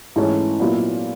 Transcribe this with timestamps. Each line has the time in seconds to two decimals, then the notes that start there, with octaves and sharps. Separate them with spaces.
0.16 G#2 E3 A3 C#4
0.60 A#2 F#3 B3 E4